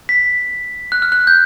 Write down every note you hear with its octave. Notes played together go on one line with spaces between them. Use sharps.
B6
F#6
F6
F#6
G6